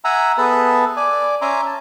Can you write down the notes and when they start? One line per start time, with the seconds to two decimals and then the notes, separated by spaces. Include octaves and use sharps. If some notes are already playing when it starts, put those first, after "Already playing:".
0.05 E5 F#5 G#5 A#5 E6
0.38 B3 G#4 A4 B4 E5 A5
0.97 D5 G#5 D6
1.41 C#4 E5 G#5 A#5 C6 D6
1.66 A5